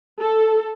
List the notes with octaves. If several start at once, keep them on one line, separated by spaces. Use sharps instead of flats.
A4